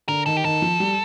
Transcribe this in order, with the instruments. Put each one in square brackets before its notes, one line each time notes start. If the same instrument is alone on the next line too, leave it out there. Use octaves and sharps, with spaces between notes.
[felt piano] D3 [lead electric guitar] A#4
[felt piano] D#3 [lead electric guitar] A4
[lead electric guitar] G4
[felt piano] D#3 [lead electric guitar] A4
[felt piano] F3
G3